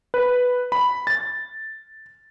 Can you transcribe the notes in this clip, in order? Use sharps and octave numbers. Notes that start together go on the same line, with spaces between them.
B4
B5
A6